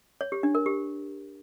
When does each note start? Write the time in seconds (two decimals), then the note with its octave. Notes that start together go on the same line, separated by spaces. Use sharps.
0.21 C#5
0.32 G4
0.43 D4
0.55 A#4
0.66 G4